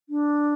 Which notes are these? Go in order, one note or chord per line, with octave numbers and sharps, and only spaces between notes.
D4